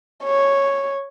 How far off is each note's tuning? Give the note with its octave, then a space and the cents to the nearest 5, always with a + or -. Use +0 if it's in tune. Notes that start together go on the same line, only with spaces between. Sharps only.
C#5 -5